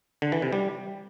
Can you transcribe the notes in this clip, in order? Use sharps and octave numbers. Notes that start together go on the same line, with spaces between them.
D3
E3
C3
G3